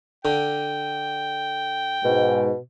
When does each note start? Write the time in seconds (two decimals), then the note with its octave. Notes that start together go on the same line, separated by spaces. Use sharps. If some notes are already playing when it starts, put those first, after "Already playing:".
0.25 D3 G5
2.04 G#2 B2